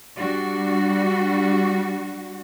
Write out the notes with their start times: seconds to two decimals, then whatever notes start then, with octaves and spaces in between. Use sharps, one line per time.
0.16 G3 D4 F#4